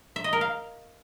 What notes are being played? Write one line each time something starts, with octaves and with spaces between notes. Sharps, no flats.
E5
D#5
A#4
F5